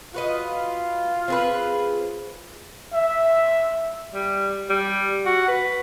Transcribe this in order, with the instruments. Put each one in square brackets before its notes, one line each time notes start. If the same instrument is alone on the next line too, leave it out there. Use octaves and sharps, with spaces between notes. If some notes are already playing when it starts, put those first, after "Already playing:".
[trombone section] F4 [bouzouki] F#4 B4 D#5
[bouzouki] C4 G#4 B4
[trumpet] E5
[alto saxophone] G3
G3
F#4
B4